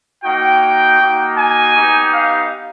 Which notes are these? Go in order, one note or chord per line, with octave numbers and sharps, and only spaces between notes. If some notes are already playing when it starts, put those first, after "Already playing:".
A#3 D#4 F#4 G5
A#3 D#4 F#4
G#5
B3 D#4 G4
F5